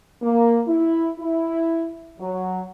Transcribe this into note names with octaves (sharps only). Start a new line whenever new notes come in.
A#3
E4
E4
F#3